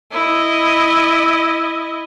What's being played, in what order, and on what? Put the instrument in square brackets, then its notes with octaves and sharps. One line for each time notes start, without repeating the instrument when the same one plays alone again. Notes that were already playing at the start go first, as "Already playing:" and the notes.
[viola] E4 D#5